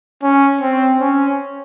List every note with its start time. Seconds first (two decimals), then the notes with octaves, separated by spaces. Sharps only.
0.22 C#4
0.62 C4
1.00 C#4